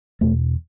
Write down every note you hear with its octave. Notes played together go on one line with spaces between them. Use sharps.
E2 B2 A3